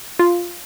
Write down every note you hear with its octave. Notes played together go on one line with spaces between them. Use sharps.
F4